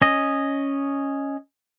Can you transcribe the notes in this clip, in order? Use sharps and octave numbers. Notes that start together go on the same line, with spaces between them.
C#4 D#5